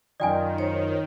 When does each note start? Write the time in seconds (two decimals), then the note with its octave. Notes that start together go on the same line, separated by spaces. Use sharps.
0.20 F#2 D#3 F4 D5 D#5 G5 G#5
0.58 C5 C#5